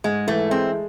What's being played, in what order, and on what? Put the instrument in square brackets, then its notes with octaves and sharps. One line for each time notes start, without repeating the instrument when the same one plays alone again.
[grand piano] G#2 [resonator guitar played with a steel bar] G#3
[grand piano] E3 [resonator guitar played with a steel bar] A3
[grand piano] G#3 [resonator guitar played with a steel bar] C4